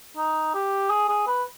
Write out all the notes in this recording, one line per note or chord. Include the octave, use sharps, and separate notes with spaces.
D#4
G4
G#4
G#4
B4